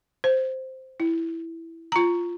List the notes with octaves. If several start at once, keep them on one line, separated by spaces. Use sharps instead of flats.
C5
E4
F4 A#5